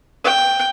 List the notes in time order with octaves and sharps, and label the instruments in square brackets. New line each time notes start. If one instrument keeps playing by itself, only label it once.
[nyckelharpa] G5